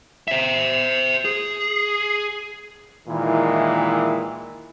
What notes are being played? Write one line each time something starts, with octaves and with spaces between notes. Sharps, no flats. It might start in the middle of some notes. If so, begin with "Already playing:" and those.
C5 E5
G#4
A#2 D#3 E3 G#3 E4